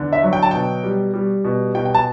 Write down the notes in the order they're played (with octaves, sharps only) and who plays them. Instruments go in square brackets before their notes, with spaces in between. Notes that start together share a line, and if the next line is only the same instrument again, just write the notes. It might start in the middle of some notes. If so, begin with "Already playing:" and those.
Already playing: [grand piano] E2 D3
E5
F#3
G5
A5
B2 G5
G3
G3
B2
B2 G5
G5
A5